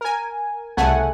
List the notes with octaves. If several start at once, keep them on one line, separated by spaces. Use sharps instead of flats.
A#4 G#5
C2 C#3 A3 F#5 G#5